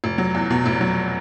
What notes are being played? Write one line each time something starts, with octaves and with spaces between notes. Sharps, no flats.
F1
F#3
E2
B2
F1
F#3